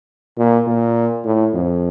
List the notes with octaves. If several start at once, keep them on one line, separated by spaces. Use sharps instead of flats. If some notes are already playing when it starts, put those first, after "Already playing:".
A#2
A#2
A2
F2